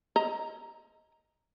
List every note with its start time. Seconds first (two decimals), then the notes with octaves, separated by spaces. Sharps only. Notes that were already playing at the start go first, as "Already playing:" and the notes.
0.16 D#5 A#5